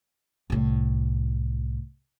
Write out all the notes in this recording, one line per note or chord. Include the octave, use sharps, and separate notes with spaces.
C2 A2